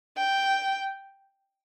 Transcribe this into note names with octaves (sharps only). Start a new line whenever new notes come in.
G5